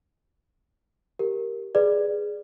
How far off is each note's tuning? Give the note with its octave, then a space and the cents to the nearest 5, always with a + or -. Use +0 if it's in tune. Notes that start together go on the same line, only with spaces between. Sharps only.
G4 +0 A#4 +0
G#4 +0 B4 +0 D5 +5